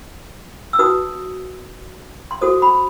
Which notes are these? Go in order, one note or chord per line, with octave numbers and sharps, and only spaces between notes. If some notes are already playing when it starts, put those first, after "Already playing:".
E6
D#4 F#4 B4 D#6
C6
F#4 A4 C5 D#6
B5